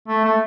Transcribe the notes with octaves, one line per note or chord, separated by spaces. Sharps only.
A3
A3